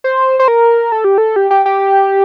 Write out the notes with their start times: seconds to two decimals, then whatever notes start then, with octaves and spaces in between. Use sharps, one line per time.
0.04 C5
0.39 C5
0.48 A#4
0.92 A4
1.04 G4
1.18 A4
1.36 G4
1.51 G4
1.66 G4